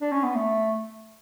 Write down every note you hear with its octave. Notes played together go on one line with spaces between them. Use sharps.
D4
C#4
B3
A3